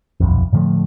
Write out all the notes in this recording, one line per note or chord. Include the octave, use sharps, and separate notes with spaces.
D#1 B1 F2
A2 D3 F3 A3